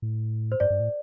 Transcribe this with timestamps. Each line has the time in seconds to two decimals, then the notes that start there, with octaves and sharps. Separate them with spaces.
0.02 A2
0.52 C5
0.60 G2 D5
0.70 G2
0.80 A2